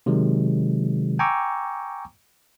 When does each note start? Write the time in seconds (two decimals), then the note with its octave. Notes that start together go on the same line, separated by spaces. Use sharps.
0.06 C3 D#3 F#3 G#3
1.19 G5 G#5 A#5 C#6 D6 E6